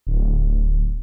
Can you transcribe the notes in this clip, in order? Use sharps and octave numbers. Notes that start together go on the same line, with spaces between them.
D1